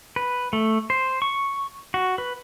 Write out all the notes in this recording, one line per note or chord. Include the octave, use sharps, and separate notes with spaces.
B4
A3
C5
C#6
F#4
B4